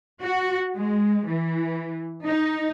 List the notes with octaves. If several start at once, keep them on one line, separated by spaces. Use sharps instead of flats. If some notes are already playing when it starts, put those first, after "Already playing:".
F#4
G#3
E3
D#4